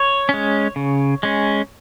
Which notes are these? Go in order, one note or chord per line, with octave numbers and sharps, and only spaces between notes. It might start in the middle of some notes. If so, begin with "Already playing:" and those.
Already playing: C#5
G#3 C#4
C#3
G#3 C#4